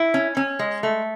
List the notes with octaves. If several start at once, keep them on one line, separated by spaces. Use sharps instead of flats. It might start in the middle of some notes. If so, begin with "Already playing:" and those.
Already playing: E4
C#4
C#4
G#3
A3